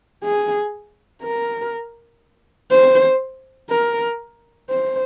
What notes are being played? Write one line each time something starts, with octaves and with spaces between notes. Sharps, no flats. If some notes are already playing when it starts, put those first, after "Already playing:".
G#4
A#4
C5
A#4
C5